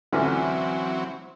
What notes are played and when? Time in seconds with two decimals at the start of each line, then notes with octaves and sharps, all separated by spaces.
0.13 A1 D3 E3 F#3 C4